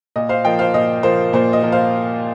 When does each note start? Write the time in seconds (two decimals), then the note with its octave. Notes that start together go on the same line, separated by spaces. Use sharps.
0.16 A#2 D#5
0.29 C5 F5
0.45 F3 A#3 D#5 G5
0.59 C5 F5
0.74 A#2 D#5
1.03 F3 A#3 C5
1.33 A#2 C5
1.53 D#5
1.63 F3 A#3
1.72 C5 F5